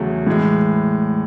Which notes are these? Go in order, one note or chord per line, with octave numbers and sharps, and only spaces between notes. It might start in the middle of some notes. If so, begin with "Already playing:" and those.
Already playing: E2 C#3 F#3 A3
A2 E3 G#3